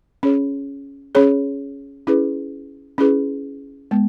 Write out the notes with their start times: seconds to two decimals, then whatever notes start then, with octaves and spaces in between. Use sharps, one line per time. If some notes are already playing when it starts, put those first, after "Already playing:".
0.23 C#4 G#4 C#5
1.15 C#4 G#4 C#5
2.07 C#4 E4 G#4 B4
2.98 C#4 E4 G#4 B4
3.91 G#3 B3